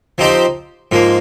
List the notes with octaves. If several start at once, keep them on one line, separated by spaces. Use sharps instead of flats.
F3 C4 D#4 G4 C5
G#2 F3 A#3